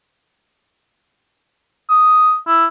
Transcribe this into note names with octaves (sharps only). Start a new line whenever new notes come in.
D#6
E4